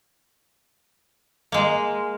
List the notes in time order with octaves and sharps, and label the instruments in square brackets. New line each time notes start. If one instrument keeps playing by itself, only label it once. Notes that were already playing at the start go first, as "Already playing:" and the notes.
[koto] G#3 A#3